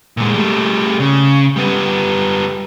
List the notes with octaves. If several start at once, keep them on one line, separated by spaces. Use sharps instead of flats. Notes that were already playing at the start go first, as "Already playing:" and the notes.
A#2 G#3
G3 A3
C#3
G3 B3